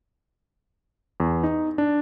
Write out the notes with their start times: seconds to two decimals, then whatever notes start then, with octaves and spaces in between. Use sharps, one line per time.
1.20 E2
1.43 D#4
1.78 D4